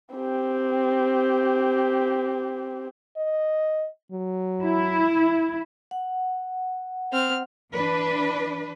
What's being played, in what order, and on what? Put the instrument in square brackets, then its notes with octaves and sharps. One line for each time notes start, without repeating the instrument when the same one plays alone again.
[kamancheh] C4 G4
[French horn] D#5
F#3
[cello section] E4
[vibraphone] F#5
[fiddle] C4 F6
[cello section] E3 D4 B4